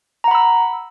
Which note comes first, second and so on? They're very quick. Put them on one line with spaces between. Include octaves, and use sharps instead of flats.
A#5 F#5 B5 E6